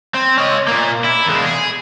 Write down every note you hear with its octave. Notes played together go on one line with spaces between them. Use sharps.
C4
C#4 D#5
A#2 A#3
E4
E2 G#3
G#4